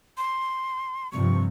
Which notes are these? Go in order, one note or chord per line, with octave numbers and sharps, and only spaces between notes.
C6
G2 C3 F3 C#6